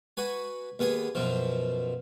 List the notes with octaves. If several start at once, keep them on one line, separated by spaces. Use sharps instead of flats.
F#4 B4 G#5
D#2 B3 G#4 G#5
F#2 B2 F3